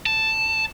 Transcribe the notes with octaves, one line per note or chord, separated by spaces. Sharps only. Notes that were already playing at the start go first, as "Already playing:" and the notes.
A5